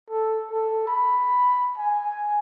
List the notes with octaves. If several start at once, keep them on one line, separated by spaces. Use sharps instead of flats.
A4
A4
B5
G#5